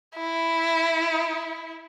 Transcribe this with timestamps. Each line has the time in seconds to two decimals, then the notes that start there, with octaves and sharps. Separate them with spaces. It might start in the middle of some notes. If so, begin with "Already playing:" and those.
0.16 E4